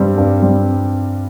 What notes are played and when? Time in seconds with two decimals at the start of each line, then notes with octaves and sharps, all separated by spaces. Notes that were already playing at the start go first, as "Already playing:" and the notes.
Already playing: G2 G3 C4
0.17 G2
0.42 G3 C4